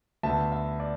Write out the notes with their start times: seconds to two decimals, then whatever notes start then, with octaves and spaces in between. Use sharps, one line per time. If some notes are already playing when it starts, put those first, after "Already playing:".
0.23 D2 D3 B3 E5 A5
0.52 E5
0.80 D5